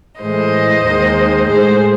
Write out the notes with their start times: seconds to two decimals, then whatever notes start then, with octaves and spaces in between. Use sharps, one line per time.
0.20 A2 E3 G#3 C5 D#5
0.84 D#2 D#3 G#3
1.47 A2 G#3 G#4 C5